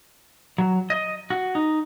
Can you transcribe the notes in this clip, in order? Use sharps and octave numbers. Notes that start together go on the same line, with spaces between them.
F#3
D#5
F#4
D#4